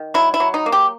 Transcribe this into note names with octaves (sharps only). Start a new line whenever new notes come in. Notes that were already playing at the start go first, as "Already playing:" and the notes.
Already playing: D#3
F#3 E4
E4
F#3
D#4
A#3
G4